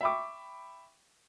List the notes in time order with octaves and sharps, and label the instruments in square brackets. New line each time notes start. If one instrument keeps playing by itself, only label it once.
[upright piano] E5 G5 B5 C#6 D6